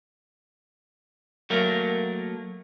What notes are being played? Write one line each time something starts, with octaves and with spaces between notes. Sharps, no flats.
F#3 A3 A#3 A#4